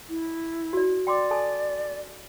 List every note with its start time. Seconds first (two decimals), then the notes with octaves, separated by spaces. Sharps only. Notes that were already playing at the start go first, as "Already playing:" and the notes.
0.09 E4
0.73 F#4 D5
1.07 D5 G5 C6 D6
1.31 A4 G#5 A5